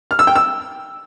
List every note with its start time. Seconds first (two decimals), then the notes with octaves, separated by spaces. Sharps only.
0.11 F6
0.19 E6
0.27 G5
0.36 E6